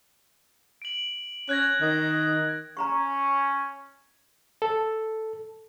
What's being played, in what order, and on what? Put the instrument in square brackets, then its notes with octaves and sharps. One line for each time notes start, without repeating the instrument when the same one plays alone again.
[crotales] D7 F#7
[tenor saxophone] C#4 [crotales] F#6 G#6 A#6
[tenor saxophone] D#3
[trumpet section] C#4 [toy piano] A#5 B5 C#6
[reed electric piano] A4